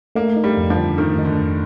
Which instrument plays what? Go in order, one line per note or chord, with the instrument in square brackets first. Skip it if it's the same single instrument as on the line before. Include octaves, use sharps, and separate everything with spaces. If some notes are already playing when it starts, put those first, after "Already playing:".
[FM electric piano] A3 [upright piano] A#3
[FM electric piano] D#4
[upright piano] G3
[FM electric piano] F2
[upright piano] F3
[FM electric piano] D3
[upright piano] D#3 [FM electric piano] A3
[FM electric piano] D#4
[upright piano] D3
[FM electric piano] F2